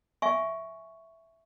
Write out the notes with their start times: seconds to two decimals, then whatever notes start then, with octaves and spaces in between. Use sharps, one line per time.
0.22 E5 F5 G#5 C#6